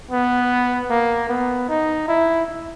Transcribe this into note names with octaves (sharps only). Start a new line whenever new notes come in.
B3
A#3
B3
D#4
E4